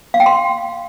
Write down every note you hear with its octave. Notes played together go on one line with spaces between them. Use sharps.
F5
G5
C6